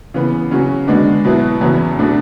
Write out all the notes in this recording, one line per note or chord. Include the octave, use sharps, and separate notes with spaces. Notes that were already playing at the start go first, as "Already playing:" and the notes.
C#3 E3 B3
C#3 F#3 C#4 F#4
D3 G#3 B3 D4 F#4
B2 F#3 B3 E4
E2 C#3 F#3 B3 E4
B2 A3 D4 F#4